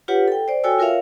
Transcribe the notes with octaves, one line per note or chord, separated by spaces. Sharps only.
F4 G4 B4 C#5 F#5
A4 G5
C5 D5
F#4 A4 C#5 G5 G#5 E6
F4 A#4 C#5 E5 F5